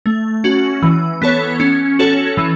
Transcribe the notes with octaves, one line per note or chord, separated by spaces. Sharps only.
A3
C#4 F#4
E3
B3 A4 C#5
C#4
F#4 A4 C#5
E3